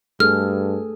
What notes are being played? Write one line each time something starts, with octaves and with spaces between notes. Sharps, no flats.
G2 A3 G#4 A4 F6